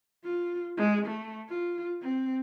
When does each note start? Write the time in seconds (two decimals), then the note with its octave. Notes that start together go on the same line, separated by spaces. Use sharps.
0.25 F4
0.77 G#3
1.07 A3
1.49 F4
2.02 C4